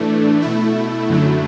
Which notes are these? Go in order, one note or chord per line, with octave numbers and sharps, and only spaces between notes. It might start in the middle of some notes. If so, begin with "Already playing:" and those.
Already playing: A2 E3 A3 D4
B2 A3 E4
F#2 D3 F#3 A3 E4